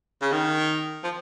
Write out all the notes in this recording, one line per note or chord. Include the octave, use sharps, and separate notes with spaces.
C#3
D#3
F3